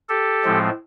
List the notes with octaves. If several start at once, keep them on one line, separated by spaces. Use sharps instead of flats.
G4 A4
A2 F3 G#3 C4